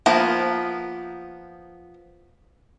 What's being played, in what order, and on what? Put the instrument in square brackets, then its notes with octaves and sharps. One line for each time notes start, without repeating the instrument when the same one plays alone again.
[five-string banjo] F3 A#3 B3 A#4